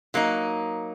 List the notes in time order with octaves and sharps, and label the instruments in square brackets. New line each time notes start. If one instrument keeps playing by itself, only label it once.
[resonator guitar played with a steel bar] F#3 A#3 D#4